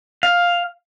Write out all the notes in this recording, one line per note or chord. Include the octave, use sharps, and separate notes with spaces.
F5